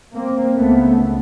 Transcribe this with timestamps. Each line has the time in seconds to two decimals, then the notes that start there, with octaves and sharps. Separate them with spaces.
0.14 A#3 C4
0.55 C#2 C#3 A3 B3